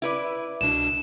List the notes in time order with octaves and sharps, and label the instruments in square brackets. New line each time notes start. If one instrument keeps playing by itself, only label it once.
[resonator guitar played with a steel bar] E4 B4 D5
[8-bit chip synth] C2 B2 D4 [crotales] E7